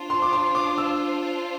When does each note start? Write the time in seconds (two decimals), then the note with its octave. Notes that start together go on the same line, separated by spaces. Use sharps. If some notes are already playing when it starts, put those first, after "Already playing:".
Already playing: D4 F4 C5
0.10 C6
0.22 D6
0.33 C6
0.55 D6
0.78 E6